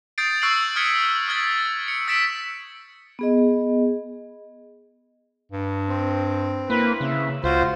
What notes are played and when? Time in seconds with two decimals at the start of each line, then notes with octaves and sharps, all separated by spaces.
0.18 D#6 G6 A6 C7 D7
0.42 C#6 E6 F#6 C7 D7 F#7
0.76 D#6 F6 G#6 B6 C#7
1.28 D#6 F6 G#6 A6 B6
1.88 C#7
2.08 E6 A6 B6 D7 E7
3.19 B3 G#4 D#5
5.52 G2
5.88 C4
6.70 A#3 E4 B4
7.01 C#3 E5
7.44 C#2 F4 F#4 C5